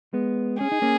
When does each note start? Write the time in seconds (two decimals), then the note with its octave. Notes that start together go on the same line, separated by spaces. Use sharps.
0.13 G#3 B3
0.61 C#4 G#4
0.72 D#4
0.82 A#3 C#4